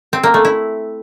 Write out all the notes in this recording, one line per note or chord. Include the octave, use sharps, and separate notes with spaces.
C4
A#3
A3
E4